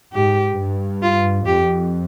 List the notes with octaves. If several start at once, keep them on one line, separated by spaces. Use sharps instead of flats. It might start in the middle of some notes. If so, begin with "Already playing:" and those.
G#2 G4
G2
F4
F2 G4